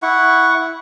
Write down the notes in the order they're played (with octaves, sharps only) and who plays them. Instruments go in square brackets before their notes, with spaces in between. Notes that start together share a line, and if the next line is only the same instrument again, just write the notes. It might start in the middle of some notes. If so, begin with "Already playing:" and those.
[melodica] E4 F#5 C#6